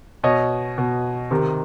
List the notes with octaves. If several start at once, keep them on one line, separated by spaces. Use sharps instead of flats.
B2 C#5 D#5
B2
C3 D#3